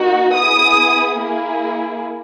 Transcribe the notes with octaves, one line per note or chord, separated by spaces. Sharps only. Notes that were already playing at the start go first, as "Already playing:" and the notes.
Already playing: A#3 D#4 F#4
B3 E4 G#4 D#6
A#3 E4 G#4